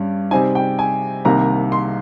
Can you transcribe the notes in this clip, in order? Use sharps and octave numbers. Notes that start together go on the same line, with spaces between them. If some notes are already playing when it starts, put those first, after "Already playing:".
Already playing: G2 G3 C#4
C3 G3 C4 D#4 G#5
G5
G#5
C2 C3 D#3 A#3 A#5
C6